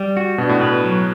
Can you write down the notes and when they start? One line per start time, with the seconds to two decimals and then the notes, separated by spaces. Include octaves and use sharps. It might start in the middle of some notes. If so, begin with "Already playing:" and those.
Already playing: G3
0.17 F#4
0.38 B2 D4
0.49 A2
0.60 B2 B4
0.84 F#3